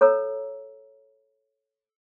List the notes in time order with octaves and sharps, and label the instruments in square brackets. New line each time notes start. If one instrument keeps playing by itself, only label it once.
[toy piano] A4 C#5 A#5 E6